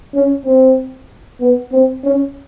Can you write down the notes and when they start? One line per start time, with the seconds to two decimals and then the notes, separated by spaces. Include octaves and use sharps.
0.14 C#4
0.45 C4
1.40 B3
1.72 C4
2.03 C#4